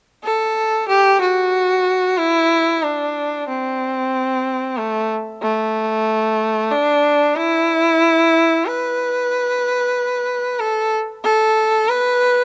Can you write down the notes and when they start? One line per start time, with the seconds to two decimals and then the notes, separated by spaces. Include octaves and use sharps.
0.24 A4
0.88 G4
1.21 F#4
2.18 E4
2.83 D4
3.48 C4
4.77 A3
5.42 A3
6.71 D4
7.36 E4
8.66 B4
10.60 A4
11.24 A4
11.89 B4